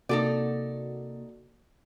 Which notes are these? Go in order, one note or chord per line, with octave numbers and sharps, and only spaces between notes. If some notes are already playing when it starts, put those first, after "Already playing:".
C3 A#3 D#4 F#4 A4 D5